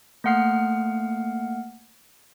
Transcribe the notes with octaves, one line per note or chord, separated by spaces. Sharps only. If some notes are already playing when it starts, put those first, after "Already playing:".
A3 A#3 F#5 F6 C7